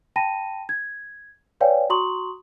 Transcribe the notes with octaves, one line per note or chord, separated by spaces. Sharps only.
G5 A5 B5 A#6 D#7
G#6
B4 C#5 D5 F5 G5 G#5
F#4 A#5 C6 C#6 D#6 F#7